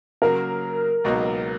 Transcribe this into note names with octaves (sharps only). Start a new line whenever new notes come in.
C#3 F#3 A#3 A#4
C#2 B2 F#3 A#3 D#4